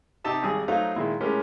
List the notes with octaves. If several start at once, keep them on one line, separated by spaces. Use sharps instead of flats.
C3 D#4 G4 A5 E6
G#1 G3 G#4 D#6
F#3 A3 D#4 F4 C5 F5
A#2 D#3 G#3 E4
A2 G#3 C#4 G4 A#4